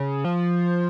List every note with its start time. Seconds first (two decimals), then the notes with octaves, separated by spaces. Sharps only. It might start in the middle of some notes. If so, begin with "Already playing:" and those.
Already playing: C#3
0.25 F3